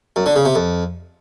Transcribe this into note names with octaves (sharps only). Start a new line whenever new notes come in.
F#2
D3
C#3
C3
F2